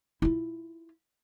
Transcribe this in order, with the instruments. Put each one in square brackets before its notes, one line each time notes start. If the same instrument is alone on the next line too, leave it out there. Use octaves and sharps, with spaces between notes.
[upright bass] E4 F4